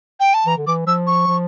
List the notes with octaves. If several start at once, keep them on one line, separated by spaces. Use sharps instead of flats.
G5
A5
E3 A#5
D3
E3 D6
F3 E6
C#6
F3